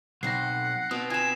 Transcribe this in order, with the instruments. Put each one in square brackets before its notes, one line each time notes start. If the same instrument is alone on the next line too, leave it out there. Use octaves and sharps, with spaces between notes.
[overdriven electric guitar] B1 [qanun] C4 D#4 [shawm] F#5 [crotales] A#6 C7
[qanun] B2 [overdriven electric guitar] C4 [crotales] D#6
[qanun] F4 B5 [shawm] G#5 [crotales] D#6 E7